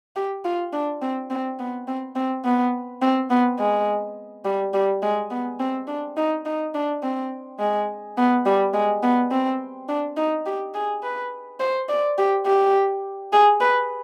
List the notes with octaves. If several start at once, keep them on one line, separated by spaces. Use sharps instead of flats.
G4
F4
D4
C4
C4
B3
C4
C4
B3
C4
B3
G#3
G3
G3
G#3
B3
C4
D4
D#4
D#4
D4
C4
G#3
B3
G3
G#3
B3
C4
D4
D#4
G4
G#4
B4
C5
D5
G4
G4
G#4
B4